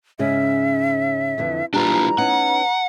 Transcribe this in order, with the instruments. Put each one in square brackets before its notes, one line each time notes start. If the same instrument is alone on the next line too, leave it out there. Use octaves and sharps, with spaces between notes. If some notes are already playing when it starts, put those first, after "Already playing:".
[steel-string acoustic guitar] G#2 C#3 C#4 [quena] E5
[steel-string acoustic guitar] F2 D3 E3
[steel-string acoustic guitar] E3 G3 [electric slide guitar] D4 F4 [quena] A#5
[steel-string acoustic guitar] B3 C#4 D#4 [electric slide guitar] F#5